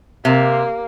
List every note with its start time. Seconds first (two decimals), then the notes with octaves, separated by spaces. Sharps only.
0.25 C3 A#3